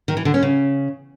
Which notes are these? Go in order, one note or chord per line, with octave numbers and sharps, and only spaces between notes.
D#3
E3
D3
C#4
C#3